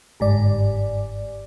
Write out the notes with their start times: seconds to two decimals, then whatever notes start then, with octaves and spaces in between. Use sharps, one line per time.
0.20 G1 G#2 D5